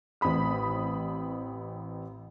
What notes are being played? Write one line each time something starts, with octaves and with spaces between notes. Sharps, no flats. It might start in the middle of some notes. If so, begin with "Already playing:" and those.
A1 C4 B5 D#6